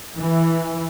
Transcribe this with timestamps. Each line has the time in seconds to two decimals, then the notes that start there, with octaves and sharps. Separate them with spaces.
0.18 E3